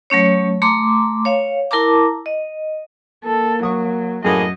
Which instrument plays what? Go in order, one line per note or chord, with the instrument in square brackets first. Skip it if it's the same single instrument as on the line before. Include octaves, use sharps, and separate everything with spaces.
[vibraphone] F#3 A3 C#4 C#5
A3 A#5 C6 D6
C#5 F5
E4 A#4 A5 A#5 D6
D#5
[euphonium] A#3 [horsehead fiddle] A4
[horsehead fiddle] F#3 [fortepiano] C#6 D#6
[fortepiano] F#2 [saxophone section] A2 A#3 G#4 [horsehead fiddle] D#5